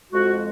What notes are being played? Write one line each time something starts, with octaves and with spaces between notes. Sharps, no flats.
F2 F3 G#3 F#4